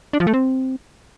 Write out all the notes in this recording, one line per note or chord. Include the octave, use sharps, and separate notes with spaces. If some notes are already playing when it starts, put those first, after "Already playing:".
D4
F3
A3
C4